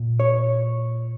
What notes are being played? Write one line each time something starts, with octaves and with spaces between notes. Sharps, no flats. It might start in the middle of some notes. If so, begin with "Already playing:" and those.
Already playing: A#2
C#5